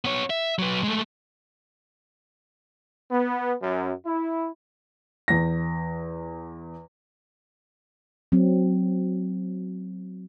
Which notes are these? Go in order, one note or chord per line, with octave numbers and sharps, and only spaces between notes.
B3 C#5
E5
F#3 B4
G#3 A3
B3
F#2
E4
E2 A#6
F#3 C4